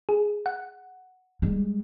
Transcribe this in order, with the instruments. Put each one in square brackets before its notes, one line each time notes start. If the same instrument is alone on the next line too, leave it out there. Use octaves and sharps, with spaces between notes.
[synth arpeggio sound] G#4
F#5
[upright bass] G3 G#3